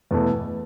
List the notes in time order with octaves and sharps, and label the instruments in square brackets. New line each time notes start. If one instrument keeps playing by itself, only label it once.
[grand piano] E2 B2 A3 E4